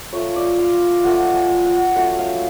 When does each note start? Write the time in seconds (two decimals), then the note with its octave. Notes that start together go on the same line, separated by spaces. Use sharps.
0.13 F3 A3 F4 C#5
0.36 D5
0.58 F5
1.04 F3 A3 F4 F#5
1.35 G#5
1.66 F#5
1.96 F#3 A3 C#4 F4 F#5
2.19 F5